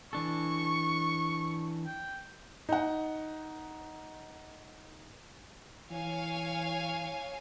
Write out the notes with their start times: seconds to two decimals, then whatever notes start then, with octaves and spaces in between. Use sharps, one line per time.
0.13 E3 D4 A4 C#6
1.86 G5
2.69 D#4 F#5
5.91 E3 C#5 F5 G#5